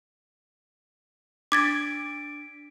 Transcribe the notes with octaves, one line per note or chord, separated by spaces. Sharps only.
D4 D6 G#6 A6 B6 D7